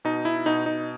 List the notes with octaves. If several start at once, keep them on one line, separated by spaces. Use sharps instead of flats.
B2 D#4
E4
B2 D#4
D#4